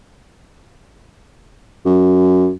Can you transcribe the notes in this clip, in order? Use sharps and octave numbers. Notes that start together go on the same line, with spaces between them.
F#2